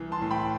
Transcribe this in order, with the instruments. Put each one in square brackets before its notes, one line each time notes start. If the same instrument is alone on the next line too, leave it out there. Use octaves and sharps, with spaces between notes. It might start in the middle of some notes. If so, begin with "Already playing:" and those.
Already playing: [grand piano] C2 E3
A5 C6
A2
G5 B5